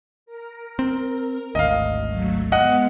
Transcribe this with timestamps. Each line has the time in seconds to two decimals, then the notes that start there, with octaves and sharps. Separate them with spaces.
0.26 A#4
0.79 C4
1.55 G#1 D2 D#5 F5
2.09 F#3 A3
2.52 G#3 B3 D#5 F5 F#5